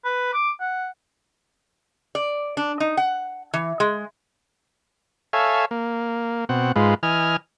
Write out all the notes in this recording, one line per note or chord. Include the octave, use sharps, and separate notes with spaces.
B4
D6
F#5
D5
D4
D#4
F#5
E3
G#3
A4 C#5 E5 F5 G#5
A#3
B2 C4 F#5
G#2 G#3 F4 B4
E3 D#5 G#5 F6